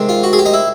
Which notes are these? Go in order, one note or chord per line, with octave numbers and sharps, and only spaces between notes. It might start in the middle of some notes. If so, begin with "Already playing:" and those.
Already playing: C3 D#3 G#3 C4
F4
F#4
G#4
G4
D#4
E4